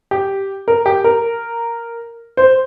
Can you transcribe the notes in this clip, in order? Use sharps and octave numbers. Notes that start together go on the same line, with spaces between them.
G4
A#4
G4
A#4
C5